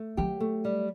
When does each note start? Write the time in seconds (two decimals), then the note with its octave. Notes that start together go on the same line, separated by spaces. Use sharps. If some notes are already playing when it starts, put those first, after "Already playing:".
Already playing: A3
0.17 F#3 G4
0.40 A3
0.65 G3